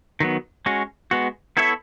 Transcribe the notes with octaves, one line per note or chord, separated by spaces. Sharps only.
D#3 F#3 B3
G#3 C#4 F#4
G#3 B3 F#4
B3 E4 A4 C#5 E5